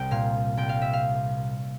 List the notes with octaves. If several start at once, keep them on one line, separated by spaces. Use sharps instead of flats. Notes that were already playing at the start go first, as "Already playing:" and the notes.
Already playing: C2 G5
A#2 F5
C2 G5
F5
E5
F5